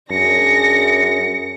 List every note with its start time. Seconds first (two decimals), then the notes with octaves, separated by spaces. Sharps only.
0.11 F#2 D4 G#4 A#6 C#7